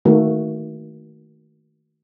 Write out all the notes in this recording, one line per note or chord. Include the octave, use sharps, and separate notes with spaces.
D#3 A3 A#3 F#4